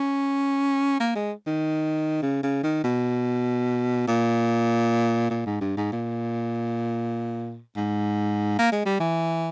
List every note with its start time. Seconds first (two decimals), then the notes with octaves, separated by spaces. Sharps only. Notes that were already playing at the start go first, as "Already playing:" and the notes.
Already playing: C#4
1.00 A#3
1.16 G#3
1.47 D#3
2.22 C#3
2.43 C#3
2.63 D#3
2.84 B2
4.07 A#2
5.30 A#2
5.46 G#2
5.61 G2
5.77 G#2
5.92 A#2
7.76 G#2
8.59 A#3
8.73 G#3
8.86 G3
9.00 E3